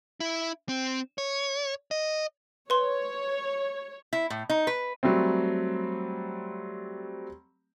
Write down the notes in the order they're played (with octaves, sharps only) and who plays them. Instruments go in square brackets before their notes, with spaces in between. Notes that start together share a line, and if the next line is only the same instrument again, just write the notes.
[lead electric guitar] E4
C4
C#5
D#5
[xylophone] B4 C6 [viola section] C#5
[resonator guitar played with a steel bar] E4
A2
D#4
B4
[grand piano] F#3 G3 A3 C4